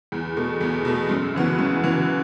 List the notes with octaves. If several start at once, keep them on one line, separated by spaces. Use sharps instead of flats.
E2
B2 A3
E2
B2 A3
F#2
C#3 E3 B3 F#4
F#2
C#3 E3 B3 F#4